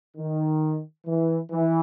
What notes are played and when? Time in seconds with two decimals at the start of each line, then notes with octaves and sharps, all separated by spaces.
0.17 D#3
1.07 E3
1.52 E3